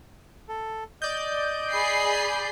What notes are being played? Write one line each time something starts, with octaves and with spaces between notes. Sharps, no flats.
A4
D5 D#5 G6
G#4 B5 C7